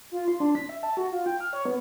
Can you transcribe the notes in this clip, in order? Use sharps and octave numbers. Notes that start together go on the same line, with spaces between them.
F4
C6
D4
B6
E5
A5
F#4
F4
G5
F6
C#5
B3